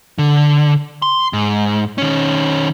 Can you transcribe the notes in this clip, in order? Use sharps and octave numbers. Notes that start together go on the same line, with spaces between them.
D3
C6
G#2
D#3 C#4